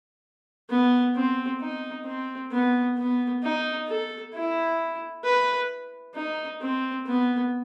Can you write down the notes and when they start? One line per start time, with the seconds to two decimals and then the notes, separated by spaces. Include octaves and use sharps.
0.70 B3
1.16 C4
1.61 D#4
2.06 C4
2.51 B3
2.97 B3
3.43 D#4
3.88 A4
4.34 E4
5.24 B4
6.15 D#4
6.61 C4
7.07 B3